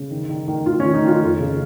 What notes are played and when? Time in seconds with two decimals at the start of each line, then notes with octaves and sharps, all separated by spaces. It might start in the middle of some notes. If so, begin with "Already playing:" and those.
Already playing: C#3
0.11 D#3
0.29 D#3
0.48 D#3
0.66 D#3 F4
0.80 C#4
0.85 D#3
0.94 D#4
1.03 D#3 F4
1.21 F2
1.40 C#3